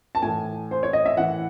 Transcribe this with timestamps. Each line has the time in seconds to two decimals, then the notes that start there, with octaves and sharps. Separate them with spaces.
0.15 A5
0.22 A2 E3 G#5
0.71 C5
0.83 C#5
0.93 D#5
1.06 E5
1.17 A2 E3 F#5